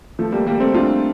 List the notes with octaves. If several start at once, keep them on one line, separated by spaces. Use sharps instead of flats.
F3 A3
G3 A#3
G3 A#3
A3 C4
D4 F4